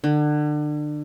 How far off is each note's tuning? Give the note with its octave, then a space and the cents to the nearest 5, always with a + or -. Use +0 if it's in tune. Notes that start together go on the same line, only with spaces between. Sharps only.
D3 +30